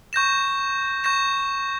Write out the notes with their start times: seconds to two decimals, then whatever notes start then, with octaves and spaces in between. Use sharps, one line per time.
0.13 C#6 G6 A#6 E7
1.04 C#6 G6 A#6 E7